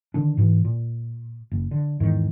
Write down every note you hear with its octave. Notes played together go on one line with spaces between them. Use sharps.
D3 D#3 D4
G#2 B2 E3
A#2
F#1
D3
E2 G#2 D#3